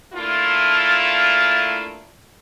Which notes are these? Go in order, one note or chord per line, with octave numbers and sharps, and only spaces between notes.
A3 A#3 D4 E4 F4